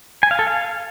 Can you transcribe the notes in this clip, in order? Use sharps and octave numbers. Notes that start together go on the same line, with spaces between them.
G#5
F5
A4
F5